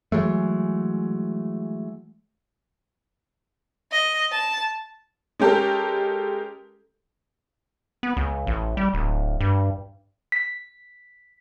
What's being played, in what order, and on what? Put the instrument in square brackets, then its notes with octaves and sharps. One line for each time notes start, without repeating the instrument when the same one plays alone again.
[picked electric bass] E3 F#3 G#3 A3
[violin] D#5
A5
[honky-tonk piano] G#3 C#4 G4 A4 A#4
[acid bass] B3
C#2
A1
G3
D1
G2
[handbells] B6